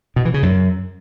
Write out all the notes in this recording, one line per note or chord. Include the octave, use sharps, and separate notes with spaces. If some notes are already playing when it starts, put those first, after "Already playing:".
B2
E3
C#3
F#2